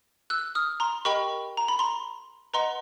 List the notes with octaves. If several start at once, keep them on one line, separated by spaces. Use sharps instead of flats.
E6 F#6
D#6 F6
A#5 C6
G4 A#4 D#5 G5 B5 C#6
A#5
B5
A#5 C6
B4 D#5 F#5 A#5 C6